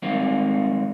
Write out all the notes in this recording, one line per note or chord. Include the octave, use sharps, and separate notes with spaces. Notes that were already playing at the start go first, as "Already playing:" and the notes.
D#2 G#2 G3 A#3 C4